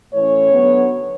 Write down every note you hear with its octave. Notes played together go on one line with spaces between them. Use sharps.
A2 E3 A3 C#4 C#5
D3 F#3 B3